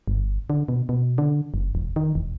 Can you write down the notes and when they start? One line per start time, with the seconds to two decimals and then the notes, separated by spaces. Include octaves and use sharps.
0.08 G1
0.50 D3
0.68 B2
0.89 B2
1.18 D3
1.54 F#1
1.75 E1
1.96 D#3
2.15 E1